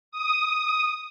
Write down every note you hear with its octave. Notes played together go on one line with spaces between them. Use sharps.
D#6